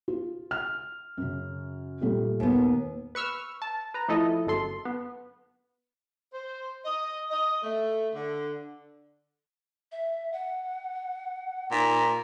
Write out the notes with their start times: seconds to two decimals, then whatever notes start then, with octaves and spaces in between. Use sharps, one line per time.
0.08 F4
0.51 F6
1.17 F#2 C#3
2.01 A#2 G3 A3
2.40 D#2 B3
3.15 B4 C#6 E6 F6
3.62 A5
3.94 B4 A#5
4.08 F3 A3 E4 A4 D#5
4.47 G1 F#2 A4 C6
4.85 B3
6.33 C5
6.84 D#5
7.29 D#5
7.63 A3
8.14 D3
9.92 E5
10.33 F#5
11.71 A#2 D#4